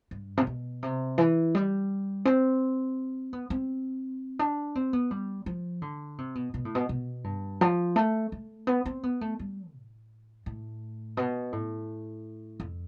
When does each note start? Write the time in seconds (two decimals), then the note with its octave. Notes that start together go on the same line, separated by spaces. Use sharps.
0.11 G2
0.37 C3
0.47 B2
0.83 C3
1.18 E3
1.55 G3
2.25 C4
3.33 B3
3.50 C4
4.39 D4
4.75 C4
4.93 B3
5.11 G3
5.46 F3
5.82 D3
6.18 C3
6.35 B2
6.54 B2
6.65 A2
6.75 B2
6.89 B2
7.24 G2
7.61 F3
7.96 A3
8.32 A3
8.67 B3
8.86 C4
9.03 B3
9.21 A3
9.39 G3
9.74 A2
10.46 A2
11.17 B2
11.53 A2
12.60 F2